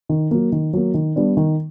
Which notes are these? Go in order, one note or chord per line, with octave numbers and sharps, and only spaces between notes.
D#3
F#3 A#3
D#3
F#3 A#3
D#3
G3 B3 D4
D#3